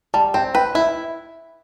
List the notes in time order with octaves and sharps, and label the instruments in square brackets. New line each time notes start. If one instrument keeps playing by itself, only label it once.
[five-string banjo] G3 [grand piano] A5
[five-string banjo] C4 [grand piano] G5
[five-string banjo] B4 [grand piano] G5
[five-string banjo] E4 [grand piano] E5